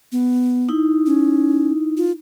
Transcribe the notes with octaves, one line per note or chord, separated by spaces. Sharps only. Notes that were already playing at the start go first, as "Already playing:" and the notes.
B3
D#4 E4
C#4
F4